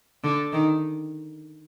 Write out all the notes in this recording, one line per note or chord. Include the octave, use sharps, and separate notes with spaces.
D3
D#3